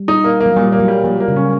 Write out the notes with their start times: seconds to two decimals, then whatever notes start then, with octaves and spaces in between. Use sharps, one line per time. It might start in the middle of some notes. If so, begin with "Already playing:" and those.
Already playing: G3
0.08 D#4
0.24 A#3
0.40 A#3
0.46 F#3
0.56 A#2 G3
0.72 A#3
0.80 F#3
0.88 G3
1.04 A#2 F3
1.20 A#3
1.28 C#3
1.36 C#4